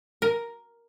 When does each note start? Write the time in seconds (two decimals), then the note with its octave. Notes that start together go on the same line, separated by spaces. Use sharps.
0.22 A#4